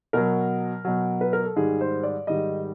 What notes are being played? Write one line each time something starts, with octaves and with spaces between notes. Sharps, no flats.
B2 F#3 A#4
B2 F#3
B4
A#4
A4
G#2 D#3 G3 G#4
C5
D5
G#2 D#3 G3 D#5